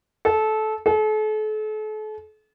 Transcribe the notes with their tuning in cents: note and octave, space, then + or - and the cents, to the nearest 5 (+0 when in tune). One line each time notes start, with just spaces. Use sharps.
A4 -20
A4 -40